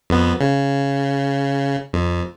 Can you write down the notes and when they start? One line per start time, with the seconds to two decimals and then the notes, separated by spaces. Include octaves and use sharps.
0.10 F2 B3
0.41 C#3
1.93 F2